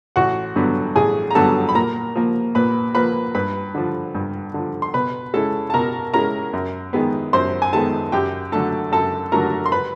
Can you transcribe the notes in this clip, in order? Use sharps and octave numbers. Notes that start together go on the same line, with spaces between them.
A1 F#4 F#5
G2 D3 F#3 B3
A1 G#4 G#5
A#5
G2 D3 F#3 B3 A4 A5
B5
A#2 A#4 A#5
F3 A#3
A#2 B4 B5
F3 A#3 B4 B5
G2 B4 B5
D3 F3
G2
D3 F3
C6
B2 B4 B5
G#3 C#4 E4 A4 A5
A5
B2 A#4 A#5
G#3 C#4 E4 A#4 A#5
F#2
D#3 G#3 B3
F#2 C5 C6
G#5
D#3 G#3 B3 A4 A5
F#2 G4 G5
D3 F#3 A3 A4 A5
F#2 A4 A5
D3 F#3 A3 A#4 A#5
C6
B4 B5